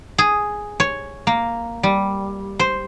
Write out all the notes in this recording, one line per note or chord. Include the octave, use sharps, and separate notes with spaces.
G#4
C#5
A#3
G3
C5